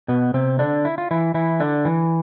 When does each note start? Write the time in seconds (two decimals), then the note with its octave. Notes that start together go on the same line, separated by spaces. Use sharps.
0.08 B2 B3
0.34 C3 C4
0.59 D3 D4
0.85 E4
0.98 F4
1.11 E3 E4
1.34 E3 E4
1.60 D3 D4
1.85 E3